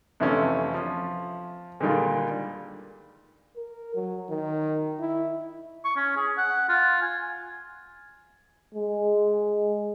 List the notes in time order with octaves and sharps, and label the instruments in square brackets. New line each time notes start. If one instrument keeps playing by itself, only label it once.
[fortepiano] F2 C3 E3 A3 C#4
F3
A#2 D3 D#3 G3 G#3 F4
[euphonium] A#4
F#3
D#3
E4
[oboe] C#6
C#4
G#4
F#5
F4
G#5
[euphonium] G#3